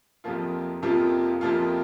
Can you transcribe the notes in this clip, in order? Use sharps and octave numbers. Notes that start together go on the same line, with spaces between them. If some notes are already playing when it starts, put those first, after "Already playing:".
F2 C3 F3 A#3 F4
F2 C3 F3 A#3 F4
F2 C3 F3 A#3 F4